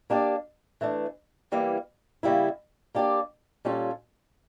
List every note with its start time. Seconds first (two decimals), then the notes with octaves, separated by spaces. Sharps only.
0.10 A#3 D4 G4 D5
0.81 E3 A3 D4
1.52 E3 G3 A#3 E4
2.23 C#3 G3 A#3 E4
2.95 A#3 D4 G4 D5
3.65 A#2 G3 C#4 F4 A4